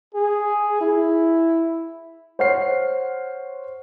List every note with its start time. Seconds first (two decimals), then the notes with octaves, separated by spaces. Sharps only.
0.15 G#4
0.81 E4
2.39 C5 C#5 F#5 F6 C7